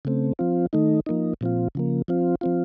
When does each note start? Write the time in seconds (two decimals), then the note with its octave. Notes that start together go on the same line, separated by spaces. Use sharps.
0.05 C#3 A3 C4
0.39 F3 C4 F4
0.73 D#3 A3 D#4
1.06 F3 A#3 D#4
1.41 A#2 F3 C4 F4
1.75 C#3 F3 A#3
2.08 F3 C4 F4
2.41 F3 C4 F4